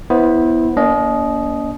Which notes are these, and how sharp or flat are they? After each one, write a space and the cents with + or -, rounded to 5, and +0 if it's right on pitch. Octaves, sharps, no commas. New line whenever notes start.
B3 +0 E4 -10 C5 +20
A#3 +20 D4 -45 D#5 +0